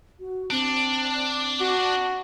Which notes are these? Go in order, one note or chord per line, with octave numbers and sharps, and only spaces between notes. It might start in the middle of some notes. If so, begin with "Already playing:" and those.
F#4
C4 D4
F#4